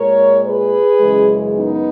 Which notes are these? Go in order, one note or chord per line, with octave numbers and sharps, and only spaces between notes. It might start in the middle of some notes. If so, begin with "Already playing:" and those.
Already playing: A#2 G#3 A#4 C#5
G#4 B4
F#2 C#3 E3 G#3
B3 D#4